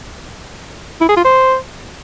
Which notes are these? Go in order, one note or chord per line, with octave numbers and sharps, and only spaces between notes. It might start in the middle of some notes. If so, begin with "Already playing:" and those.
E4
G#4
F4
C5